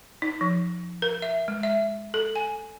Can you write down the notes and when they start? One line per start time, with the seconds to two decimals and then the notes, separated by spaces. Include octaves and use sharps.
0.22 D#4
0.41 F3
1.02 A#4
1.22 E5
1.48 G#3
1.63 E5
2.14 A4
2.36 G#5